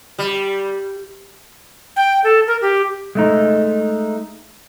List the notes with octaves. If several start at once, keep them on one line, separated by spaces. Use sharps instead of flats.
G3
G5
A4
A#4
G4
G#3 A3 D#4